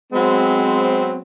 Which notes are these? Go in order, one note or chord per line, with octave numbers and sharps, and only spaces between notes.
F#3 G#3 B3 C4